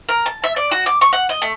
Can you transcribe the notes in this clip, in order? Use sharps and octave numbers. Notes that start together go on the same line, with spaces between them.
A#4
A5
E5
D5
F#4
D6
C#6
F#5
D#5
A3